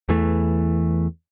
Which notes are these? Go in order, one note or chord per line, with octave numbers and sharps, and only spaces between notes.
E2 E3 A3